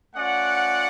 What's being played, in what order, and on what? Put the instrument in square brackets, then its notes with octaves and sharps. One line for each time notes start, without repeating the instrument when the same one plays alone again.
[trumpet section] A3 C#4 F4 D5 F#5